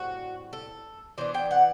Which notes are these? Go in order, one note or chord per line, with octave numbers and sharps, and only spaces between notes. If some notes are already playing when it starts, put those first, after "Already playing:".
Already playing: A2 G3 C4 F#4
A4
E3 B3 D4 C5
G5
F#5